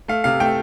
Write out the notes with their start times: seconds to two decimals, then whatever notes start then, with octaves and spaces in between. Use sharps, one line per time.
0.08 A3 F5
0.24 C3 F5
0.40 A3 G5